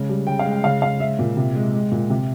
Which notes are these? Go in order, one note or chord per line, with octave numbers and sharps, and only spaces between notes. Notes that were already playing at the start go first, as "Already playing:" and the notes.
Already playing: C#3 G#3
G3
C#3 G5
F5
G#3
G5
C#3 F5
G#3 F5
G#3 E5
A#2
C3
G#3
G#3
A#2
C3